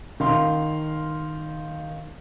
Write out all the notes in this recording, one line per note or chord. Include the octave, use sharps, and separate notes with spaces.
D#3 F5 C6